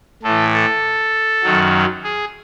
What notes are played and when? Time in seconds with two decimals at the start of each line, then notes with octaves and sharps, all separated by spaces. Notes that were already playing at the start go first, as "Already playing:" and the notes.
0.23 A2 E3 A4
0.53 A4
1.43 F#2 D#3 F#3
2.04 G#4